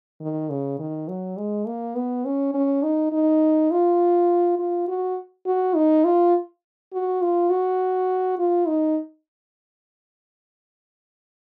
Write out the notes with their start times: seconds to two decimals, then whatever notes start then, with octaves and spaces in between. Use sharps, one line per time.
0.20 D#3
0.50 C#3
0.79 D#3
1.08 F#3
1.37 G#3
1.67 A#3
1.96 B3
2.25 C#4
2.54 C#4
2.83 D#4
3.12 D#4
3.71 F4
4.59 F4
4.88 F#4
5.47 F#4
5.76 D#4
6.05 F4
6.93 F#4
7.22 F4
7.50 F#4
8.39 F4
8.67 D#4